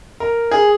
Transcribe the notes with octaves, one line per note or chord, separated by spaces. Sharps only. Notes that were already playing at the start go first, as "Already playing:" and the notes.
A#4
G#4